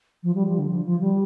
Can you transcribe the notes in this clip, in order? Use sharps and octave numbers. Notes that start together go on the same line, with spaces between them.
F3
G3
F3
D3
F3
F3
G3